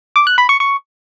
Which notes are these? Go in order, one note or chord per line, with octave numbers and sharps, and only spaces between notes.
D6
F#6
B5
C#6
C#6